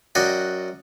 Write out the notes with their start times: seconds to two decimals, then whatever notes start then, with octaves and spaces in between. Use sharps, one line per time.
0.15 F#2 F#4 D5 D#5 F#5 G5